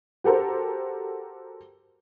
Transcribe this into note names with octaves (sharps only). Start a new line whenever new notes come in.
F#4 G4 A4 A#4 C5